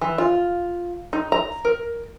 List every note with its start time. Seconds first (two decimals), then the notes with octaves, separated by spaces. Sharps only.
0.01 E3
0.18 F4
1.13 D#4
1.32 A#5
1.65 A#4